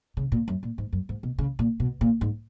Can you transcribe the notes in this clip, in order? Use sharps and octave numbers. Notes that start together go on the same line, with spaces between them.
C#3
A#2
F#2
A#2
G#2
F#2
G#2
B2
C#3
A#2
B2
A#2
G#2